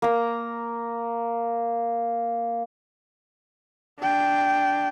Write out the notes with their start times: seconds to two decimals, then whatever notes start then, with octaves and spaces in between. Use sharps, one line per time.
0.02 A#3 A#5
3.99 D4 G5